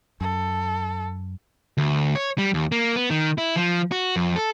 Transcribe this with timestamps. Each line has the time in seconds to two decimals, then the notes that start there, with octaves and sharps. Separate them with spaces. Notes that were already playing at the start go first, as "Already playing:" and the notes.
0.21 F#2 A4
1.78 D2
2.15 C#5
2.38 G3
2.54 D#2
2.72 A#3
2.96 B3
3.10 D#3
3.38 E4
3.56 F3
3.92 F#4
4.16 F2
4.36 A4